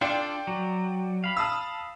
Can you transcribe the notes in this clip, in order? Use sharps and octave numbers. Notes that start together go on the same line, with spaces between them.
D4 F4 A4 D5 G5
F#3
F5 B5
A5 D#6 E6